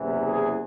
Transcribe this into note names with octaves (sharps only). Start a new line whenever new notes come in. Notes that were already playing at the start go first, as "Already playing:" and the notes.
Already playing: F#1 E2 C3 E3
G#4